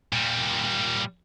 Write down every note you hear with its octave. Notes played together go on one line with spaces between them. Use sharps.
A#2 G3